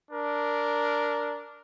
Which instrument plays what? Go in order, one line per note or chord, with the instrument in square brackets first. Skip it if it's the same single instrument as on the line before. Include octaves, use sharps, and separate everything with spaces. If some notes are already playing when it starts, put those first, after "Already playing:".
[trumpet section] D4 A#4